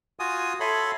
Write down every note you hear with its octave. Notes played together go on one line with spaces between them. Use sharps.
F4 F#4 G#5 D#6
A4 C#5 E5 B5 C6